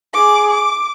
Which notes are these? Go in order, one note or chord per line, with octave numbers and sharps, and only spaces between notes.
G#4 D6
D6